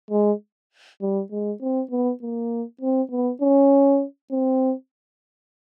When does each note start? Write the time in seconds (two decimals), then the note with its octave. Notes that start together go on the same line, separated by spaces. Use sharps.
0.11 G#3
1.02 G3
1.32 G#3
1.61 C4
1.91 B3
2.22 A#3
2.81 C4
3.11 B3
3.42 C#4
4.32 C4